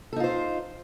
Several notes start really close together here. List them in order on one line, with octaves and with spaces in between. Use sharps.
A4 D#4 F4 C5